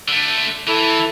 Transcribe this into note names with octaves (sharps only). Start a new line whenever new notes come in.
D3 A3
E3 E4 A4